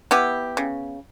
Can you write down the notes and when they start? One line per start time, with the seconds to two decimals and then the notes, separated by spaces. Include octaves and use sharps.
0.11 B3 E4 G4
0.57 C#3